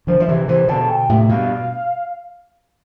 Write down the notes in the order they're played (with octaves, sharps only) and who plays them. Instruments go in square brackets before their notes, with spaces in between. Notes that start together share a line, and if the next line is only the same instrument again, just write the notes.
[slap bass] D3 F3 [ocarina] C5
[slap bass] F3 [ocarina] E5
[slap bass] C3 E3
[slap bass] C3 E3 [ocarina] C5
[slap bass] B2 D3 [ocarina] A5
[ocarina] G5
[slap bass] A2 C3 [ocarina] E5
[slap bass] G2 B2 [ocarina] F5